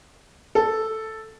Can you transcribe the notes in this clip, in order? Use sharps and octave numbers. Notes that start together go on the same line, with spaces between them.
A4